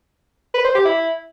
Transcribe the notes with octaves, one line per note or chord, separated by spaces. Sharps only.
B4
C5
G4
E4